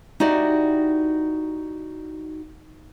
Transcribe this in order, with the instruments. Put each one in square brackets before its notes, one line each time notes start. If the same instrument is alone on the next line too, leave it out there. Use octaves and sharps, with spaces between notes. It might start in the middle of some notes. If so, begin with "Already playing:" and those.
[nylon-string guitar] D#4 E4 F#4 G4 D5